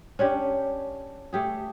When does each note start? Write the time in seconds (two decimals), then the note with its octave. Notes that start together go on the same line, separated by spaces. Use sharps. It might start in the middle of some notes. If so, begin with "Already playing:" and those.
0.19 C#4 D4 G4
1.33 A3 G4 G#4